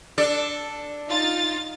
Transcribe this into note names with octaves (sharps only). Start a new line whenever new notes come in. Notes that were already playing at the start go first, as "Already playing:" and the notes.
D4 A4 D5
D#4 F4 A6